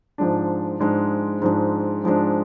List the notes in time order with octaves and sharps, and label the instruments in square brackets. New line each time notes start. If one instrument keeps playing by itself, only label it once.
[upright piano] G#2 F3 G#3 D4
G#2 F3 G#3 D4
G#2 F3 G#3 D4
G#2 F3 G#3 D4